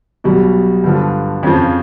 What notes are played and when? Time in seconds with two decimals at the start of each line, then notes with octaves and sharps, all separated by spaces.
0.24 B1 B2 G3
0.84 G2 D3 F3
1.43 F2 C#3 F3